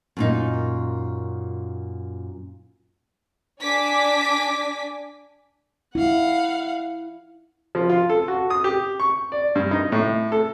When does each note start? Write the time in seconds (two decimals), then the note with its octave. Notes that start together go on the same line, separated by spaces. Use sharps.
0.17 F#2 A#2 D#4
3.61 D4 G#5 D6 B6
5.95 E4 F5 F#5
7.75 F3
7.89 F4
8.10 A4
8.28 F#4
8.50 D#6
8.64 G4
9.00 C#6
9.32 D5
9.55 G2
9.71 D#4
9.92 A2
10.32 A4